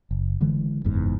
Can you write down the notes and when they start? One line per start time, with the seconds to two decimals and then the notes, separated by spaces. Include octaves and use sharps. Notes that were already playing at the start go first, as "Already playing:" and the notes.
0.11 F#1
0.41 D3 E3 G#3
0.85 F#1 E2 G#2